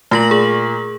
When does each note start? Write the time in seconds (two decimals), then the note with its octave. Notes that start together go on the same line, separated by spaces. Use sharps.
0.11 A#2 A3 A#6 F#7
0.31 G#4